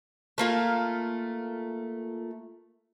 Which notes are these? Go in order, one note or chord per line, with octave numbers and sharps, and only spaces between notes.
A3 A#3 F4